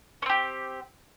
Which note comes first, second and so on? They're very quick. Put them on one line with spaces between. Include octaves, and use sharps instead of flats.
C#4 C4 G4